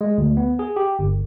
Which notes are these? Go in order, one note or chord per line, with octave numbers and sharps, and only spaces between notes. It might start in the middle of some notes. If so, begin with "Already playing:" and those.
G#3
D2
B3
G#4
G4
G1